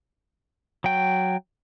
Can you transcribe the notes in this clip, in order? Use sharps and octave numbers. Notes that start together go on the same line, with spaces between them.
F#3 G5